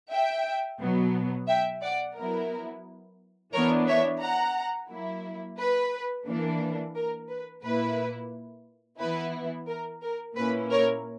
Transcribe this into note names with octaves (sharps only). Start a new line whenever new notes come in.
E5 G5
B2 F#3 B3
E5 G5
D5 F#5
F#3 B3 E4 A#4
E3 B3 D4 A#4 C#5
C#5 E5
F#5 A#5
F#3 A#3 E4
B4
E3 A#3 D4
A#4
B4
A#2 A#3 E4 B4
E3 B3 E4 B4
A#4
A#4
A#2 A#3 C#4 E4 B4
A#4 C#5